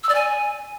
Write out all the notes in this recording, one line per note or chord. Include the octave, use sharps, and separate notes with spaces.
E6
D5
G#5